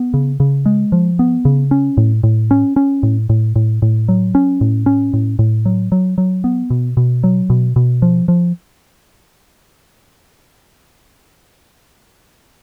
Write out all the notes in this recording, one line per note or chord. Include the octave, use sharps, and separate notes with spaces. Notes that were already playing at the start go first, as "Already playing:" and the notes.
Already playing: B3
C#3
C#3
G#3
F3
B3
C#3
C#4
A2
A2
C#4
C#4
A2
A2
A2
A2
F#3
C#4
A2
C#4
A2
A2
F#3
F#3
F#3
B3
B2
B2
F#3
B2
B2
F3
F3